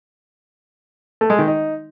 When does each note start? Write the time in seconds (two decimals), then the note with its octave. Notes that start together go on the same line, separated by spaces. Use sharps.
1.21 A3
1.30 G#3
1.39 D#3
1.48 D#4